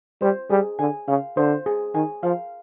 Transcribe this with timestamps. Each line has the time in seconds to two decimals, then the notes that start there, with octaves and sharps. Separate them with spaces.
0.22 G3 C5
0.50 G3 G#4
0.79 D3 G#5
1.08 C#3 F5
1.37 D3 C5
1.66 G#4
1.94 D#3 G#5
2.23 F3 F5